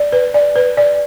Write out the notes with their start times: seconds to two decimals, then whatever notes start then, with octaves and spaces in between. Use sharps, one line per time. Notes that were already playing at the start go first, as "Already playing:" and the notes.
Already playing: D5
0.13 B4
0.34 D5
0.56 B4
0.77 D5